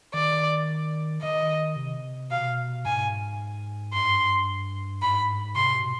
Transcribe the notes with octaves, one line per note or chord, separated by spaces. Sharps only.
D#3 D5
D#3 D#5
C3
B2 F5
G#2 G#5
G2 C6
G#2 B5
C3 C6
B2